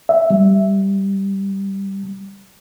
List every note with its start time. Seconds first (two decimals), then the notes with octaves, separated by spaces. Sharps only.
0.09 E5
0.30 G3